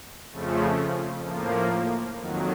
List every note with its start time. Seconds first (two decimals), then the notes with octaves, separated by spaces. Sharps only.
0.32 F2 C#3 F3 A3
1.25 A2 F3 A#3
2.18 F2 D#3 F#3